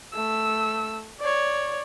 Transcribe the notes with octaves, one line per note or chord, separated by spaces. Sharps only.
A3 E6
C#5 D5